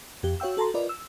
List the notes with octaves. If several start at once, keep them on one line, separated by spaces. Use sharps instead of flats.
F2 G4
F#4 C#5 F5 G5 E6
F#4 A4 A5 A#5 C6
F4 A#4 B4 D5 D#5
E6